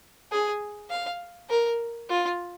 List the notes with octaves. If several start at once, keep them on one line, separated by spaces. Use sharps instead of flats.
G#4
F5
A#4
F4